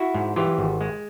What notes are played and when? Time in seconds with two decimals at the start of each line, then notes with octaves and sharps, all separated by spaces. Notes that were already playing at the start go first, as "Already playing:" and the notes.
Already playing: E4 F#4
0.14 G#2
0.36 E3 F4 G4
0.58 G#1
0.81 G#3